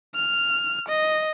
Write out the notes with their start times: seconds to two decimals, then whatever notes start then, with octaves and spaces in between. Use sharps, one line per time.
0.14 F6
0.88 D#5